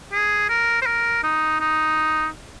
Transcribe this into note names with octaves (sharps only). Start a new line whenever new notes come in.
G#4
A#4
C5
A#4
D#4
D#4